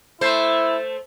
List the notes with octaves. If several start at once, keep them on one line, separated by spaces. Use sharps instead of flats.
A3 E4 C5